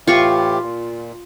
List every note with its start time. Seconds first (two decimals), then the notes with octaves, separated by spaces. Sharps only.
0.07 A2 E3 F4 G4 C#6
0.62 A#2